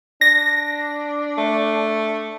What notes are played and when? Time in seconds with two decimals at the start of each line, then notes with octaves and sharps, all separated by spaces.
0.21 D4 A#6
1.38 A3